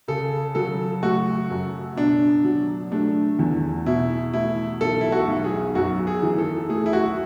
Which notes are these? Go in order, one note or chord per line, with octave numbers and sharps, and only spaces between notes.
C#3 A4
F#3 A4
A3 F#4
F#2
B2 D4
F#3
A3 D4
E2
B2 E4
A3 E4
B1 A4
E4
F#4
B1
G#4
F#2 F#4
G#4
E3
A4
A3 G#4
E4
F#4